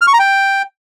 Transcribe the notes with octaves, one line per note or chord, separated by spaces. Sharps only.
F6
C#6
A#5
G5